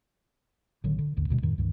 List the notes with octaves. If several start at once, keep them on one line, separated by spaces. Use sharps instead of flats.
A1 D3 D#3 F#3
D3
A1 D#2 D3
D#1 D2 B2 G#3
F2 A2 D#3
C#2 G2 D#3 E3